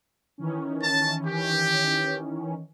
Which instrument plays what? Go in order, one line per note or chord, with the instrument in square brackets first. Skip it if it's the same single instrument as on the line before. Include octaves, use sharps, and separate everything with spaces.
[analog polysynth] D#3 E3 C#4
[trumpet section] A5
G4